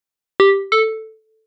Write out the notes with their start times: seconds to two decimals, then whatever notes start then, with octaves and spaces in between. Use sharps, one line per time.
0.40 G4
0.72 A4